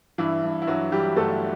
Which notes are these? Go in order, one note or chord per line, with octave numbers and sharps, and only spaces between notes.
G2 E3 E4
G2
E4
G2 F#3 F#4
E3 G3 G4
G1 A3 A4